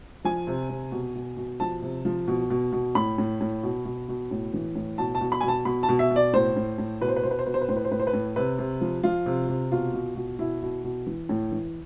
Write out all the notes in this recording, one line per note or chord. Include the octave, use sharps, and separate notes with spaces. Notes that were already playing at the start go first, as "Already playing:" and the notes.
F3 G#5
C3
C3
B2
B2
B2
F3 A5
C3
F3
B2
B2
B2
A2 B5
A2
A2
B2
B2
B2
A2
E3
A2
B2 A5
A5
B2
B5
B2 G#5
A5
B2 B5
A5
B2
E5
B2
D5
A2 C5
A2
A2
B2 B4
C5
B4
B2 C5
B4
C5
B2 B4
C5
B4
A2 C5
B4
C5
A2 B4
C5
B4
A2
C3 B4
C3
F3
F3 F4
C3
C3
B2 F4
B2
B2
B2 E4
B2
B2
E3
A2
E3